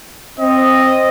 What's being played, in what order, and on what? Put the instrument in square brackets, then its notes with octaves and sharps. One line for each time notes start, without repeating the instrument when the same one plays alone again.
[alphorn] C4 [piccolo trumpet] D#5